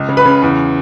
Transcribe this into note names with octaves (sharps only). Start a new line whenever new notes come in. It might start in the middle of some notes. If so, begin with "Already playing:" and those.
Already playing: C#2
C#3
B4 B5
C#3
E2